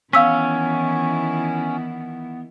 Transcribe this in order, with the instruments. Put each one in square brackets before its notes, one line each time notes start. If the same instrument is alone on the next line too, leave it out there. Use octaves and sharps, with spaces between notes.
[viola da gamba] D#3 E3 E4 [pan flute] B3 [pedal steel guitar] C#4 [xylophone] F5 E6 B6